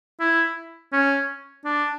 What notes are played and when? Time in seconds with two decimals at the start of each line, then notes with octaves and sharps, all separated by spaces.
0.20 E4
0.93 C#4
1.65 D4